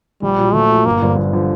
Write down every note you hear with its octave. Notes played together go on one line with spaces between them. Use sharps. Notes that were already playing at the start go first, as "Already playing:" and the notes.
A#1 G3
A#2 F#3
A#1 A3
A#2 F#3
G1 A#3
G2 D3 F3
G1
D3 F3